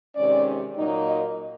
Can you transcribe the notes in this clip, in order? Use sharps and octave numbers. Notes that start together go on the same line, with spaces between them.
C3 D#3 G#3 C#4 D5
A#2 F#3 A#3 D#4
D#5